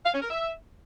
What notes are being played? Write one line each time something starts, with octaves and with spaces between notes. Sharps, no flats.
F5
C#4
A#4
E5